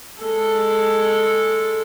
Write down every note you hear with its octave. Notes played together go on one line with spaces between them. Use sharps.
G#3 A4